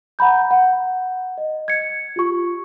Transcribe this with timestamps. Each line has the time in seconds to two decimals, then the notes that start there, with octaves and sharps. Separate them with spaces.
0.19 F#5 A#5 B5 G6
0.51 F#5
1.38 D#5
1.68 G#6 C#7
2.16 F4 G4 C#6